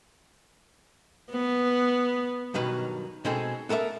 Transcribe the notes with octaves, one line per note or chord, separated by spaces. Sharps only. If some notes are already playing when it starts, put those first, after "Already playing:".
B3
G2 B2 D#3 F#3 B4
B2 G#3 C4 D#4 G#4 A4
B3 A4 A#4 D5 E5